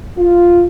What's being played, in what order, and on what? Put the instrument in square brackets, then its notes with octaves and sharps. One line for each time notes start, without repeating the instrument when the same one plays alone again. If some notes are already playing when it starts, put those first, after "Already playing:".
[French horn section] F4